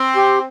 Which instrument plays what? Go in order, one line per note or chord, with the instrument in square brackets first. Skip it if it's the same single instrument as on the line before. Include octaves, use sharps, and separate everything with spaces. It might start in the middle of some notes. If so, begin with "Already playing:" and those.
Already playing: [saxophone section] C4
[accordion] G4